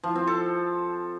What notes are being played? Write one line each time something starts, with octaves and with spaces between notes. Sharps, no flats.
F3
C4
A4